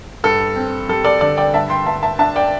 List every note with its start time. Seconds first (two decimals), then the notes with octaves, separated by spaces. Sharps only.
0.24 G2 A4
0.56 C4
0.89 G3 A4
1.05 A4 D5
1.21 D3 A4 D5
1.37 D5 G5
1.54 G2 E5 A5
1.70 G5 C6
1.86 G2 E5 A5
2.03 E5 A5
2.19 D4 E5 A5
2.36 D5 G5